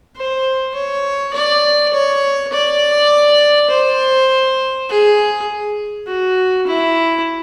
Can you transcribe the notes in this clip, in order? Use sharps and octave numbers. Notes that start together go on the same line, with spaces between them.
C5
C#5
D5
C#5
D5
C5
G#4
F#4
E4